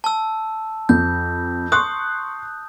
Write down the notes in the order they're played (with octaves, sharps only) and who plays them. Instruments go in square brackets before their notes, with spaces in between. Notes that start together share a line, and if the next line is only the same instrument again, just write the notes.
[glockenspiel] A5 E6
[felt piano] F2 [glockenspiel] G6
[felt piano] C6 C#6 F#6 [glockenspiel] D#6